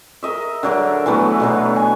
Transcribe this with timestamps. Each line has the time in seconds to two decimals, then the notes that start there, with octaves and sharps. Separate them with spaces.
0.23 A#4 D#5 E5
0.63 D3 F#3 A#4
1.06 E3 F#3 A3 B3
1.40 B2 D3 F#3
1.76 G#5